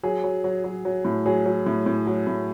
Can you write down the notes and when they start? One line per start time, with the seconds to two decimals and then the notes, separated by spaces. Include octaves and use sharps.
0.03 F#3 G#4
0.24 F#3
0.44 F#3
0.64 F#3
0.85 F#3
1.05 A2
1.26 F#3 G#4
1.46 F#3
1.66 A2
1.86 A2
2.06 F#3
2.27 A2